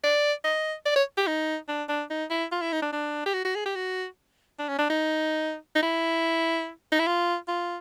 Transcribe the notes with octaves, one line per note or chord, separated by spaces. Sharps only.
D5
D#5
D5
C#5
G4
D#4
D4
D4
D#4
E4
F4
E4
D#4
D4
D4
G4
F#4
F#4
G#4
G4
F#4
D4
C#4
D4
D#4
D#4
E4
D#4
E4
F4
F4